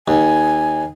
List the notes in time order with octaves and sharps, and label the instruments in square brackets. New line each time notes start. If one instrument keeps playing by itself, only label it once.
[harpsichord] D#2 [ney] G#5